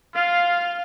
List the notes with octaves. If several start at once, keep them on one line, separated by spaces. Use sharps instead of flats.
F4 F5